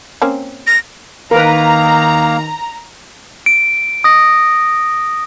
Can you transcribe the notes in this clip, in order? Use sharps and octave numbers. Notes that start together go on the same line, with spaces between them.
A#3 C4 C#4
A#6
D#3 A#3 A#4 B4 F5 A#5
D7
D#6 A#6